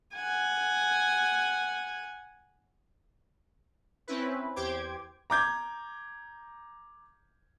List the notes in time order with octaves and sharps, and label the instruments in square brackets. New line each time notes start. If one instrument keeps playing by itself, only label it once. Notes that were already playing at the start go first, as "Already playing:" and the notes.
[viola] F#5 G#5
[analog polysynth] C4 C#4 E4 B4
E2 G4 C5 G5 D6 G#6
[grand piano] A#5 D6 G6 G#6